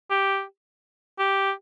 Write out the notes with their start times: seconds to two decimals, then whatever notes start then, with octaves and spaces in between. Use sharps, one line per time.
0.10 G4
1.19 G4